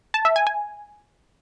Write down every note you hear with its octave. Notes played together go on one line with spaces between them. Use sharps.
A5
E5
G#5
G#5